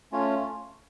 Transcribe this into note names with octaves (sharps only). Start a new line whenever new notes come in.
A3 C#4 F4 C#5